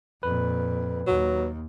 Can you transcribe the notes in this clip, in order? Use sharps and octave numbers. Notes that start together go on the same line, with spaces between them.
F2 A#2 B4
D#2 F#3